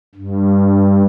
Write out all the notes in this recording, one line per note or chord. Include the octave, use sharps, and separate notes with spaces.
G2